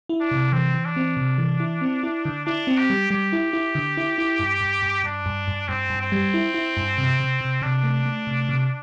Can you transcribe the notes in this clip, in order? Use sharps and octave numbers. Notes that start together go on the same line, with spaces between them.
E4
D4
C3
E3 C4
E3
D4
C4
C3
E3
E4
C4
E4
D3
D4 E4
C4
G4
G3
G3 G4
E4
E4
D3
E4
E4
G2
G2
G2
G2 D4
G2
G2
G2 C4
G2
C4
G3
E4
E4
G2
C3
C3
C3
C3 D4
A3
A3
C3
C3